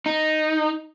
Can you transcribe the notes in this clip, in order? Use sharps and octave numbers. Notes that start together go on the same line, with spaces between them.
D#4